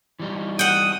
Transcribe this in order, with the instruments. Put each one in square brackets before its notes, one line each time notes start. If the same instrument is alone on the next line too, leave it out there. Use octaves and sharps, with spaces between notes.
[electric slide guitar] E3 G3 D#4
[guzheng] F#5 G5 [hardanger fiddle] D#6